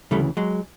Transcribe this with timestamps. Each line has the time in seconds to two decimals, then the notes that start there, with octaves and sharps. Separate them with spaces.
0.11 D2 C#3 E3 G3 A3
0.37 F#3 G#3